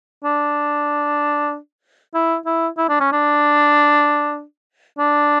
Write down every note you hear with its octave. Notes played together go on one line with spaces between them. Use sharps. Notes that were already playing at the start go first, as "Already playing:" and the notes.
D4
E4
E4
E4
D4
C#4
D4
D4